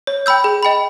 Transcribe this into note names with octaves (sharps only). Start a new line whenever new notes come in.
C#5
G5 B5 E6 G6
G#4
D#5 G5 B5